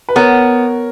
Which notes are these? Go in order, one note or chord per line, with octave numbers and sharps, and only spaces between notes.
B4
B3 A#4 C#5